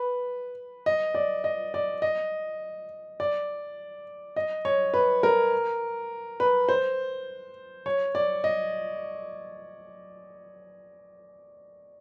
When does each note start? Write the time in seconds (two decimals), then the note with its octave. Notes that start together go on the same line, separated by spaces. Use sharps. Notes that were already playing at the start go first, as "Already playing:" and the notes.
Already playing: B4
0.86 D#5
1.15 D5
1.44 D#5
1.74 D5
2.02 D#5
3.20 D5
4.36 D#5
4.65 C#5
4.94 B4
5.23 A#4
6.40 B4
6.69 C5
7.86 C#5
8.15 D5
8.44 D#5